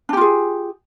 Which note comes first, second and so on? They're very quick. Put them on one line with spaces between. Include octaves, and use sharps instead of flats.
D4 G4 F4 G#4